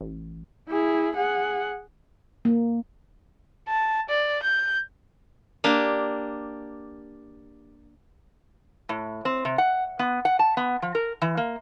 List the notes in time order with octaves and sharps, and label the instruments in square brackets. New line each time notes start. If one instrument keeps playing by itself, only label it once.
[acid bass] A1
[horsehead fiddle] E4 G#4
G#4 F#5
[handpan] A#3
[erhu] A5
D5
G6
[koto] A#3 D4 G4
[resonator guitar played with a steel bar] A2
C4
C3
F#5
B3
F#5
A5
B3
F3
A#4
E3
A#3